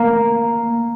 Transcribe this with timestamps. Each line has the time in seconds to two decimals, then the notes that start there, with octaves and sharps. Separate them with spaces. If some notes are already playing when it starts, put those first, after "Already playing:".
Already playing: A#3